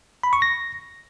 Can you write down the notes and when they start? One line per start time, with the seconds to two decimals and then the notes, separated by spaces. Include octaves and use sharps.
0.23 B5
0.33 C#6
0.42 A#6